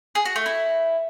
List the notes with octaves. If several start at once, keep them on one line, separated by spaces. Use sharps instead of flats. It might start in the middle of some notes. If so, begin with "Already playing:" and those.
G#4
F#4
A3
E4